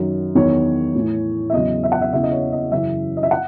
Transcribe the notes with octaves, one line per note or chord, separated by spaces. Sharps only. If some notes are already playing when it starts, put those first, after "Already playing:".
Already playing: F#2 D#3 F#3
E2 D#3 F#3 C#5
A2 E3
E5
E2 C#3 F#3 D#5
E5
F#5
E5
E2 C#3 E3 E5
D#5
C#5
D#5
F#2 C#3 E3 E5
D#5
E5
F#5